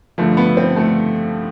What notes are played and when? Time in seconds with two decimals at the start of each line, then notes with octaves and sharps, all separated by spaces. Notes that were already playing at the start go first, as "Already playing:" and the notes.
0.18 G2 D3 F3 A3
0.37 B3
0.57 C4
0.76 A3